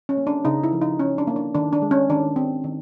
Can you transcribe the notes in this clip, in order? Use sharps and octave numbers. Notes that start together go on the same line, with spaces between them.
C#4
A#3
D4
C#3 D#4
E4
F3
D#4
C#4
D4
A#3
D4
D#3 D4
D4
G#3
C#4
D#3 D4
C4
D#3